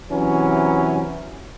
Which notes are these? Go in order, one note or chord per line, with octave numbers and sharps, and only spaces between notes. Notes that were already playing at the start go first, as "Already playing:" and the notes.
C3 E3 F#3 C#4